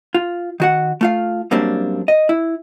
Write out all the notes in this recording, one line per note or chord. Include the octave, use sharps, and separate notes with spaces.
F4
D#3 F#4 F#5
A3 F4 F5
F#2 G3 A#3 C4 D4
D#5
E4